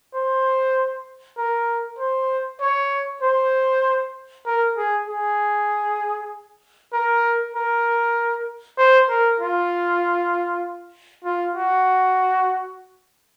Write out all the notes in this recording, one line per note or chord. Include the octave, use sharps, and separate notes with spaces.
C5
A#4
C5
C#5
C5
A#4
G#4
G#4
A#4
A#4
C5
A#4
F4
F4
F#4